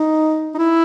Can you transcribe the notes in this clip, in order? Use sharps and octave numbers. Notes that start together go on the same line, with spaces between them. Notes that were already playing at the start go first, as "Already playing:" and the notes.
Already playing: D#4
D#4
E4